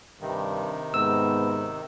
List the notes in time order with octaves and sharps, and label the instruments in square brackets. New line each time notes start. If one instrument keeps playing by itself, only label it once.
[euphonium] G2 [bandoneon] C3 D#3
[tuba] G#2 [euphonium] B3 [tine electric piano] E6